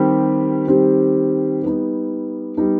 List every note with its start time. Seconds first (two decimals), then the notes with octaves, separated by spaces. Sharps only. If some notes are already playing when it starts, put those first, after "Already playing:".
Already playing: D#3 G3 C4 G4
0.68 D#3 G3 C4 G4
1.62 G3 B3 D#4
2.57 G3 B3 D#4